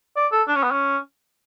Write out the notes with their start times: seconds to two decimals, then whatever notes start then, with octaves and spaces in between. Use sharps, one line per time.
0.16 D5
0.32 A4
0.48 D4
0.55 C#4
0.63 B3
0.71 C#4